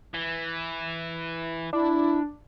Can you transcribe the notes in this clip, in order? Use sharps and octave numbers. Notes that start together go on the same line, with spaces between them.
E3
D4 E4